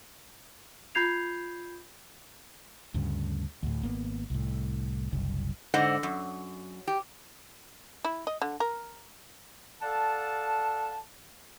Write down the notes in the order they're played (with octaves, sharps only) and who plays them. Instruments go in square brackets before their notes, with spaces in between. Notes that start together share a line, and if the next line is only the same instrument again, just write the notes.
[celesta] F4 B5 G6 G#6 C7 F7
[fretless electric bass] D2 G2 C#3
D2 A2
G#1 A#3 B3
C2 A2
F#1 C2
[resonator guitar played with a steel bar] G#2 D3 C5 D#5 F#5
F#2
G4
[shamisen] E4
D#5
D3
A#4
[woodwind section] A4 D5 F5 F#5 A5